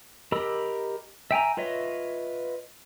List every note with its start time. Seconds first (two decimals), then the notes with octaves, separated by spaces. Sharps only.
0.32 G4 A#4 D#5 B5 E6
1.31 E5 G5 G#5 A#5
1.57 F4 B4 C#5 D#5 E5